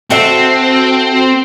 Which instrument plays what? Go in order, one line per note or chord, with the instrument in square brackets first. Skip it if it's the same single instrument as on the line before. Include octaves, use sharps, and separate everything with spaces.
[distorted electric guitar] C4 [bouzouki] F#4 A4 E5